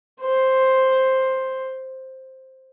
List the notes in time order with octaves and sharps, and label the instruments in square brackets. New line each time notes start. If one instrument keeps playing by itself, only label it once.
[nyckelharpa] C5